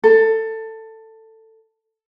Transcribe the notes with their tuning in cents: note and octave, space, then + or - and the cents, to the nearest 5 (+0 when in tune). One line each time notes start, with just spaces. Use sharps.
A4 +15